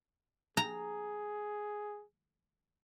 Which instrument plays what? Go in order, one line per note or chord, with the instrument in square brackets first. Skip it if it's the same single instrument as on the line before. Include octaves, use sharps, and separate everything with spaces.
[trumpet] G#4 [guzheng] A#5